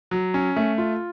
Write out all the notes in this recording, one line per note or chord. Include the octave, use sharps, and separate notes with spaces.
F#3
C#4
A3
F4